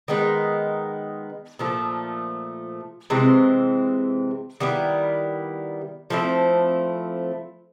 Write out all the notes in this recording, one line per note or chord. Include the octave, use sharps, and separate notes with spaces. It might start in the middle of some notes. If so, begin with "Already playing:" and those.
D#3 G#3 B3 D#4
A#2 F3 A3
C3 E3 G#3 C4
D#3 G3 B3 E4
F3 A3 C4 E4